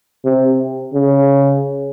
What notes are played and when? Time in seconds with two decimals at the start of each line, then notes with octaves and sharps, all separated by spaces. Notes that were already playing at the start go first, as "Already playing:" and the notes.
0.25 C3
0.94 C#3